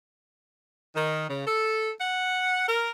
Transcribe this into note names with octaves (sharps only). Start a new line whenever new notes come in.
D#3
C#3
A4
F#5
A#4